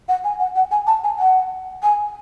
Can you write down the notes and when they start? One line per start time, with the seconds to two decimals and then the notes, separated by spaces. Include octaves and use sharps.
0.08 F#5
0.24 G#5
0.40 F#5
0.56 F#5
0.71 G#5
0.87 A5
1.04 G#5
1.19 F#5
1.83 G#5